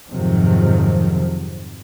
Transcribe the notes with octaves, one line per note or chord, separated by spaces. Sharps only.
F2 G#2 C3 D#3 F3 F#3